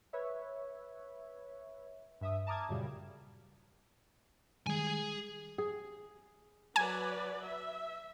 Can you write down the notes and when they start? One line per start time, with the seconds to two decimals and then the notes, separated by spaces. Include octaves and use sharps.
0.13 B4 C#5 E5
2.21 G2 E5 D#6
2.47 A5 A#5 D6 D#6 F6 G#6
2.69 F#2 A#2 C#3 G3
4.67 D#3 G3 G#3 G#4 G#5
5.58 G#4
6.76 F#3 B4 D5 G#5
7.45 E5